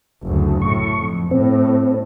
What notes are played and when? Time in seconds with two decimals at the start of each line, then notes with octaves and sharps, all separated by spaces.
0.24 F#1 D2
0.62 A2 C#6
0.98 F2
1.31 A2 C4